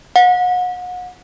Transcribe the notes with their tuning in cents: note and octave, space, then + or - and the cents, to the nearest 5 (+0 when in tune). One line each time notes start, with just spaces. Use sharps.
F#5 -35